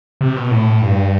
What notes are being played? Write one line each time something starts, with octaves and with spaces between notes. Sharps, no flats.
C3
B2
A2
G2